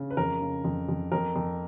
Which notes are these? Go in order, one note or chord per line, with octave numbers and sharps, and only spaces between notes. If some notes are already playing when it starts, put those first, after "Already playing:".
Already playing: C#3
B4
F2 A#4
C#3
F2
F2
F2 A#4
F2